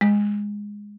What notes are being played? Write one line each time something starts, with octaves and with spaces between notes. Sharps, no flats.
G#3